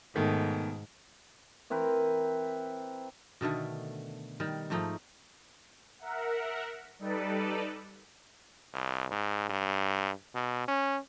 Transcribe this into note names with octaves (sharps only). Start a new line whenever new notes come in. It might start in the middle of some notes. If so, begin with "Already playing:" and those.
G#2 B2 D#3 A3
E3 C4 A#4 B4
B2 D3 D#3 A3
D#3 G3
G#2 F3 A3 D#4
A#4 E5 F#5
G3 D#4 A4 B4 D5
C2
G#2
G2
B2
C#4